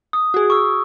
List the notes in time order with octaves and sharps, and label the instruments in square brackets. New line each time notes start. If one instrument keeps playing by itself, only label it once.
[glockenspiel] D#6
[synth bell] F#4 G#4
[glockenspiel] C#6 E6